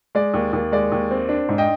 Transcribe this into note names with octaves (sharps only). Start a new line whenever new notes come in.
G#3 D5
D#2
D#2
G#3 D5
D#2
C4
D4
G#2
D#5 G5